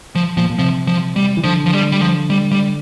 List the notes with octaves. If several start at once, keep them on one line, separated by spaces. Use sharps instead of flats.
F3
A#2 F3
A#2
C3 F3
F3
G3
E3
D3 F3
F3
G3
G3
F3
G3
G3